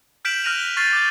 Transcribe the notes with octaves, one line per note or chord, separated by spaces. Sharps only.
F6 G6 B6 D7 E7 F#7
F6 F#6 A#6 D7 D#7 F7
F7 G7
C#6 F6 A6 C7 D#7 G7
D6 G6